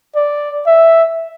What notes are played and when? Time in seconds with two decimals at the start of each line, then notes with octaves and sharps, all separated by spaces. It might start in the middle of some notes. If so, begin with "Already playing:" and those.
0.15 D5
0.67 E5